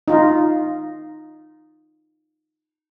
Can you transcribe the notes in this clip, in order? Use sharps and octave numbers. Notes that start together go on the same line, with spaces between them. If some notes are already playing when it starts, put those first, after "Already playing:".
D#4 F4